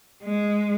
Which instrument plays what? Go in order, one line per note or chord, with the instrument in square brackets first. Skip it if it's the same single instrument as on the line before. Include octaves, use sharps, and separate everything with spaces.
[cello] G#3